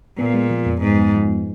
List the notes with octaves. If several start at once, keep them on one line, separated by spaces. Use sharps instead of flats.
A#2 B3
G#3
F3
F2
G#2 B3
G#3
F3